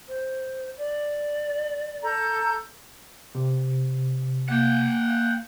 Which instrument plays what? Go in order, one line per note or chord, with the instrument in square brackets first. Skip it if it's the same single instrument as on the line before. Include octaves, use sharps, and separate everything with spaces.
[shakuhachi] C5
D5
[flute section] A4 A#5 G6
[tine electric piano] C3
[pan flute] A#3 [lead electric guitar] F#5 G5